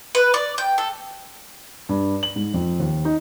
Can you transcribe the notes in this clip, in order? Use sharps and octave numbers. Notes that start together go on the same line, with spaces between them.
B4
D5
G5
A4
G2
F#7
G#2
F2
D#2
D#4